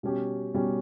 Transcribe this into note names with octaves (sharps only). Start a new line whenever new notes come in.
B2 G3 C#4 G4
B2 G3 C#4 G4